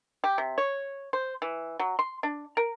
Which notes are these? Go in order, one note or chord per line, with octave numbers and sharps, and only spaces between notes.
G4
C3
C#5
C5
E3
F#3
C6
D4
A#4